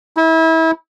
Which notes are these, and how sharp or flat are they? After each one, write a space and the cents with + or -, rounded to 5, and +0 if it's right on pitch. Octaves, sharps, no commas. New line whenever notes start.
E4 -30